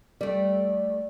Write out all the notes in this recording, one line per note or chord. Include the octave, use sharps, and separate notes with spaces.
G3 A3 D5